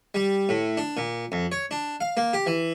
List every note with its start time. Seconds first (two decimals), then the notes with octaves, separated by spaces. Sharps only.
0.15 G3
0.49 A2
0.77 D4
0.97 A#2
1.32 F2
1.52 C#5
1.71 D4
2.01 F5
2.17 A#3
2.33 G4
2.46 E3